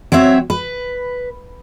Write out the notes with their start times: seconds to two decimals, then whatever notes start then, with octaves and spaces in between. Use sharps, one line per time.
0.12 F#3 C4 C#5 E5
0.50 B4